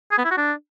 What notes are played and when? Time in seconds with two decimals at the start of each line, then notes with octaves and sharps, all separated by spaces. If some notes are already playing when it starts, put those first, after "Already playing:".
0.11 G#4
0.18 B3
0.25 E4
0.31 F#4
0.38 D4